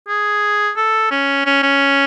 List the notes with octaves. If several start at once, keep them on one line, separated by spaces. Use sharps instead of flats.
G#4
A4
C#4
C#4
C#4